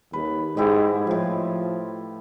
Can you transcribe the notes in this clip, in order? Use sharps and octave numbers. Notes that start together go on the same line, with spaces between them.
D#2 B4
G#2 E4 G4 D#5
A2 F3 F5